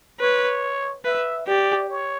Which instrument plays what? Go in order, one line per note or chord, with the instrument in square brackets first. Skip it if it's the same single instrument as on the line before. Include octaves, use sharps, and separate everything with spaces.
[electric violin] B4 [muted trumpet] C#5
[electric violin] B4 [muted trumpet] E5
[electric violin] G4 [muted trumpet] D5
[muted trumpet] C#5